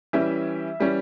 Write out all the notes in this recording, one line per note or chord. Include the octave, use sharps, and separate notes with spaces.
E3 G3 C#4 E5
E3 G3 C#4